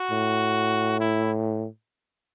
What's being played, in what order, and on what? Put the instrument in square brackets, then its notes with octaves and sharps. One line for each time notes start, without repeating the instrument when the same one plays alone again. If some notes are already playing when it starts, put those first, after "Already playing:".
Already playing: [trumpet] F#4
[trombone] A2
[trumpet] E4